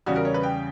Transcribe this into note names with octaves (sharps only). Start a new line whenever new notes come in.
E2 C#3 G3 C#4 F#4
A#4
C#5
B4
G5